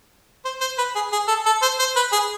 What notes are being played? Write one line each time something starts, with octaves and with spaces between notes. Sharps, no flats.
C5
C5
B4
G#4
G#4
A4
A4
C5
C5
B4
G#4